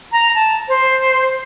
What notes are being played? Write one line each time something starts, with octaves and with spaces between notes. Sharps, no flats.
A#5
A5
C5